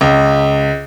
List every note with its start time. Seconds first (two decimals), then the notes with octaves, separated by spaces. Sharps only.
0.01 C#2